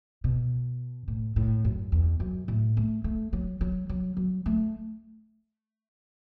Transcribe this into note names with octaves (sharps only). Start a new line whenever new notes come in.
B2
A2
A2
F#2
E2
F#2
A2
A3
A3
F#3
F#3
F#3
F#3
A3